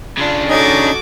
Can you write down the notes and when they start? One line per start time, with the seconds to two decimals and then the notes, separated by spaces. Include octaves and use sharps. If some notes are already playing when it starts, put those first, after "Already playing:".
0.18 C#3 D4 F4
0.49 C#4 D#4 F#4 A4 D#5 D6 G#6